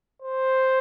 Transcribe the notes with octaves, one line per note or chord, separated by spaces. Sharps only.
C5